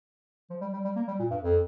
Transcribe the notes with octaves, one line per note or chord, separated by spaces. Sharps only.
F3
G3
G3
G3
A#3
G3
A#2
G2
F2